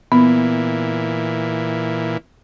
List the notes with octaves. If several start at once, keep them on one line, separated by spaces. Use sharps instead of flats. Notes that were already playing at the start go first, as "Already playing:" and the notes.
A#2 E3 B3